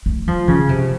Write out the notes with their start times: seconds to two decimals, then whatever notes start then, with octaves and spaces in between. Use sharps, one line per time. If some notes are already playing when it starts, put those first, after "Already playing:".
0.06 A3
0.28 F3
0.48 C#3
0.69 C3